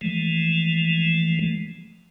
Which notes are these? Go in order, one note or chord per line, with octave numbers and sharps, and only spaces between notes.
E3 F3 G#3 A3